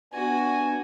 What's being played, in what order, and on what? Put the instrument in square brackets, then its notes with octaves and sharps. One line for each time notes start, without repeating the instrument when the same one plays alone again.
[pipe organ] B3 D4 [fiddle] F#4 [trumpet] G#5